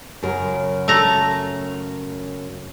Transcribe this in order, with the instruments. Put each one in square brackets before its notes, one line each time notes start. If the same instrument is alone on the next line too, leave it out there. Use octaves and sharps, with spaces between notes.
[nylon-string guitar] F#2 C#3 A#4
[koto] A3 A#5